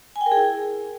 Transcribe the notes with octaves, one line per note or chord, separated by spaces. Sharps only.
G#5
G5
A#4
G#4
E4